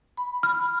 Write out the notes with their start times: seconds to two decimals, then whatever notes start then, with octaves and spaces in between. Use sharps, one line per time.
0.17 B5
0.43 F6